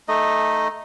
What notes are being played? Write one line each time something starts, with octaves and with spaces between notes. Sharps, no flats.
A3 D#4 D#5